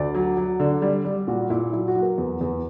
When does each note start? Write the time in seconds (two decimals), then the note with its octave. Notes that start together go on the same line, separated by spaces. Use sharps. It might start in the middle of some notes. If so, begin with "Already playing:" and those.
Already playing: D2 D5
0.15 F#3
0.37 F#3
0.60 D3
0.82 G3
1.05 G3
1.28 A#2 F#4
1.50 A#2 E4
1.73 F#3 E4
1.88 F#4
1.95 F#3
2.03 A#4
2.18 E2
2.41 E2